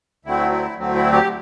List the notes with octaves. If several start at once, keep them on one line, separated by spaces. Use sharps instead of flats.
D2 D3 F#3 A3 C4 E4
E4
D2 D3 F#3 A3 C4
E4
G4